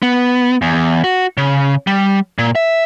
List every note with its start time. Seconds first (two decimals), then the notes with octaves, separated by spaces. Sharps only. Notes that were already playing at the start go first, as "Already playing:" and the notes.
0.02 B3
0.62 E2
1.04 F#4
1.38 C#3
1.87 G3
2.39 A#2
2.55 E5